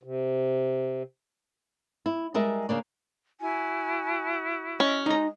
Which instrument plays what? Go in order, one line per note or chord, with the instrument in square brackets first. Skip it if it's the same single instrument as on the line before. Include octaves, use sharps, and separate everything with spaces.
[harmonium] C3
[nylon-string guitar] E4
G3 G#3 A#4 E5
C#3 A#3 D4
[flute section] E4 F#4 [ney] G#5
[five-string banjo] C#4 [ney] D#5
[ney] G#3 [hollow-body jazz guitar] D#4 A#5